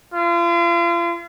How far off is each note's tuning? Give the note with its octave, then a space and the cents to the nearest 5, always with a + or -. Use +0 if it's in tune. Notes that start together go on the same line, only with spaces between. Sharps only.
F4 -40